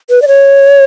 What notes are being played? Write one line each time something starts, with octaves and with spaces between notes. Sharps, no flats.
B4
D5
C#5